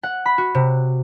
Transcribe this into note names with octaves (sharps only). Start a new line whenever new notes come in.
F#5
B5
F#4
C3